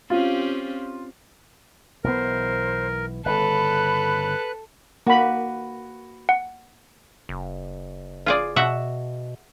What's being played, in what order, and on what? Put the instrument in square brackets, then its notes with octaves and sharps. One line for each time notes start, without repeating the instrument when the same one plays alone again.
[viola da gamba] C4 C#4 G4 [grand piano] F4
[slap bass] B1 E3 B3 [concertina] A#4 [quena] C5
[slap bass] G1 C#3 [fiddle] A4 [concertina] B4 F#6 [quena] B5
[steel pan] A#3 B5 [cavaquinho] F#4 B4
[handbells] F#5
[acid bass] F#1
[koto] F4 G#4 D5
[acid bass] B2 [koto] F#4 E5 F#5